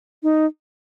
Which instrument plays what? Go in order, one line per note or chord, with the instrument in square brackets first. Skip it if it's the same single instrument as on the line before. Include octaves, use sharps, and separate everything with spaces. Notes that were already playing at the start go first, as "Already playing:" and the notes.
[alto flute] D#4